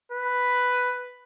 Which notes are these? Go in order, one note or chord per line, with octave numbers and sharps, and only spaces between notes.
B4